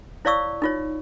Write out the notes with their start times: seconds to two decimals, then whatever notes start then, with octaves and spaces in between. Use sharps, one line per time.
0.25 E4 C#5 D5 F5 C#6 E6
0.62 D#4 F4 C#5